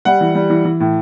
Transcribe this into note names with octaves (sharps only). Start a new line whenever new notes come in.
G3 F#5
E3
G3
E3
E3
A2